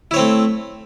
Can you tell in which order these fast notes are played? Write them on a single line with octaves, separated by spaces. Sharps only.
E4 C#5 C4 A3